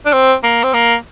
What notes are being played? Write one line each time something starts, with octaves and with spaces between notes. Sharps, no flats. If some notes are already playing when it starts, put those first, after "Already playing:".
D4
C4
A#3
C4
A#3